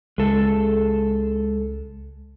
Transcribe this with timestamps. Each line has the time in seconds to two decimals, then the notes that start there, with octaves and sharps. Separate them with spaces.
0.18 C#2 G#3 A4